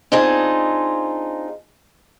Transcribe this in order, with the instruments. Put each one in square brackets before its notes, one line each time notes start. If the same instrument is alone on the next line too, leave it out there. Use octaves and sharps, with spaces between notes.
[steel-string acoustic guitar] C4 D4 D#4 F4 G#4 A5